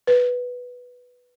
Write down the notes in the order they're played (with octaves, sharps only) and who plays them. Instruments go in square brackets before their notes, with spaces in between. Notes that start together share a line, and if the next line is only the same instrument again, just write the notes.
[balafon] B4